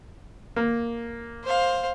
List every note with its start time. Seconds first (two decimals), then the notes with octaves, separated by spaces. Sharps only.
0.56 A#3
1.44 C5 F5